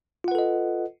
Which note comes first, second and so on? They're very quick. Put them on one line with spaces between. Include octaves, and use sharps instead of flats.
F4 F#5 B4 A4 D#5